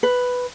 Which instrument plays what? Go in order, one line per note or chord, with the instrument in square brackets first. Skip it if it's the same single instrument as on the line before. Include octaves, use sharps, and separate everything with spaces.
[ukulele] B4